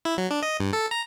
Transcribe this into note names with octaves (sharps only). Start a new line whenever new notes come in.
E4
F#3
D4
D#5
G2
A4
A#5